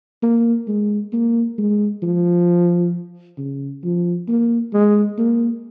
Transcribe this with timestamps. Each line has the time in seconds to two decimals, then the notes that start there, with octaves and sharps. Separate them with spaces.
0.23 A#3
0.68 G#3
1.13 A#3
1.58 G#3
2.03 F3
3.38 C#3
3.84 F3
4.28 A#3
4.73 G#3
5.18 A#3